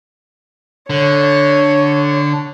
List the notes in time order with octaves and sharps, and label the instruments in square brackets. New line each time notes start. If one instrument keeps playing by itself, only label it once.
[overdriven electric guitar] D3 [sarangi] C#5